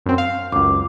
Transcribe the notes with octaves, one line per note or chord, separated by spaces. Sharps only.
F#2 C4
F5
C#2 F#2 D6